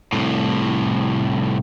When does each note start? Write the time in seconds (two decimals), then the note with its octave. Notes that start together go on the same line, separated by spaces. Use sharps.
0.13 C2 A2